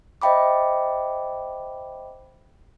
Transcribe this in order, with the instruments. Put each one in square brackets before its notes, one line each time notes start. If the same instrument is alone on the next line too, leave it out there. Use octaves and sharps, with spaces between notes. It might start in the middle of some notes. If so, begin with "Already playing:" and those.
[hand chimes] C5 D#5 E5 G5 B5 D6